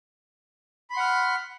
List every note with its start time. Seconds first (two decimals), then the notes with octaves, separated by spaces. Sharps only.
0.90 B5
0.93 C6
0.97 F#5
1.00 F6